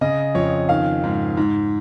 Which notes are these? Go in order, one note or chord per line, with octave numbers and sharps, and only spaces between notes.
C#3 D#5
F2 C#5
D#3 F5
G#2
G#2